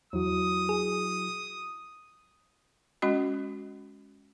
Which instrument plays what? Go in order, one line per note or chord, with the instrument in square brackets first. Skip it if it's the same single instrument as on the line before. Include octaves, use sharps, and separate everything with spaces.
[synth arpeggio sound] E2 [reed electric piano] F#3 E4 F#4 [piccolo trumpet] D#6
[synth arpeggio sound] G#4
[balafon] G#3 C#4 F#4 D#5